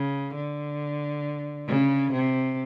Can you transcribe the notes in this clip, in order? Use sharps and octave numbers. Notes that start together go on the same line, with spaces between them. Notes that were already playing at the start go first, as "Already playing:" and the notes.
Already playing: C#3
D3
C#3
C3